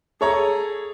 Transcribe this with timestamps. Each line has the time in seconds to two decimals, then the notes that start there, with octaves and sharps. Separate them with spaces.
0.21 G#4 A4 C#5 A#5